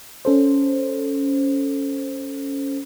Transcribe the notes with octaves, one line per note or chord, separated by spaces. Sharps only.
C#4 A4 C5